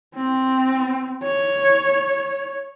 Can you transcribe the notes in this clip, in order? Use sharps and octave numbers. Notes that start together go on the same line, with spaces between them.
C4
C#5